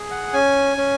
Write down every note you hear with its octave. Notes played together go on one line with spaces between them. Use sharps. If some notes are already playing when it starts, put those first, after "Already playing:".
Already playing: G#4
F#5
C#4 G#5
C#4